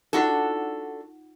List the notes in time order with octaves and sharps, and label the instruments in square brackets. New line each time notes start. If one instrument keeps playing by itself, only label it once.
[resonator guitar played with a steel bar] D4 F#4 A4 [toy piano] D#4 F4 F#5